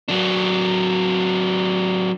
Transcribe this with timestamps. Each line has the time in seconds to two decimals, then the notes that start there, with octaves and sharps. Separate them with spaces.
0.08 F#3 D4